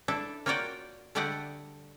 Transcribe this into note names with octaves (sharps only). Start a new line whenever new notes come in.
D4 E4 A4
A#3 F4 F#4 C#5 D5 G5
D3 G3 A3 D5 D#5 F#5